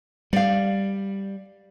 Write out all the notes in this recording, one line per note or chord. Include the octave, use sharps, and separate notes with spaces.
G3 D5 F5